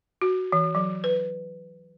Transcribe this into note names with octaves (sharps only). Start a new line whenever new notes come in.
F#4
E3
F#3
B4